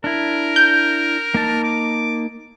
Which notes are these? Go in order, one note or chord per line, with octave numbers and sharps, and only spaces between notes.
D4 E4 A#4
G6
A#3 D#4 A5
D6